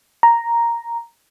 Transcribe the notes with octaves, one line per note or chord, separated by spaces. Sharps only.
A#5